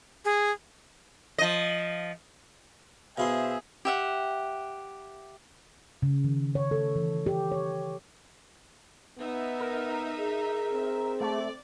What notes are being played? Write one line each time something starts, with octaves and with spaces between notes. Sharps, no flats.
G#4
F3 D#5
B2 E4 G#4 C5 E5 F5 C6
G4 E5 F#5
C#3
D#3
C#5
A4
E3
G4
C#5
B3 D#4 E5
A#4
G#4
C4
A3 D5